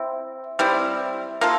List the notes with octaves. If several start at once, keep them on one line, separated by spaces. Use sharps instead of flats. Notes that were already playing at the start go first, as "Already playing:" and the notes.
Already playing: C4 E4
G3 C4 E4
A#3 F4 A4